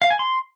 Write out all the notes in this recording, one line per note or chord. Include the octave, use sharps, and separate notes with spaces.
F5
G#5
C6